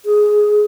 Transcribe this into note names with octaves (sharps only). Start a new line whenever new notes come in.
G#4